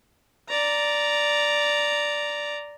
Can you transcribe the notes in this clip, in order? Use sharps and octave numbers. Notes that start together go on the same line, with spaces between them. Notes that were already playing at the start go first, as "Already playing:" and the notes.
D5 A#5